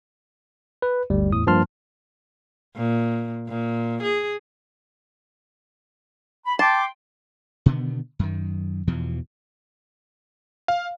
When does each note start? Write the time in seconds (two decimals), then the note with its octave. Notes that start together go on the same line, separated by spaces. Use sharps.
0.82 B4
1.10 G1 D2 G3
1.32 E2 A2 D#6
1.47 G2 F3 A#3 A5 C6 F6
2.76 A#2
3.47 A#2
4.02 G#4
6.46 B5
6.59 G5 A5 C6 D6
7.66 B2 D3 D#3 B3
8.19 F#2 D#3
8.87 E2 B2 E3 F3
10.68 F5